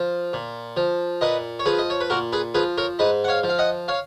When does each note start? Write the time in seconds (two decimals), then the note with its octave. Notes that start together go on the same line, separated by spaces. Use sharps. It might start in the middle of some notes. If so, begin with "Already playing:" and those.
Already playing: F3
0.33 A#2
0.77 F3
1.21 A#2 B4 D#5
1.59 C#5
1.65 F3 G#4 B4
1.79 D#5
1.90 C#5
2.01 B4
2.10 A#2 F#4 A#4
2.33 G#4 B4
2.54 F3 G#4 B4
2.78 A#4 C#5
2.99 G#2 B4 D#5
3.24 F#5
3.28 C#5 F5
3.43 F3
3.49 F5
3.59 D#5 F#5
3.88 C#5 F5